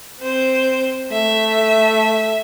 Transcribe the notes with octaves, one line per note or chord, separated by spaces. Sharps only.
C4 C5
A3 E5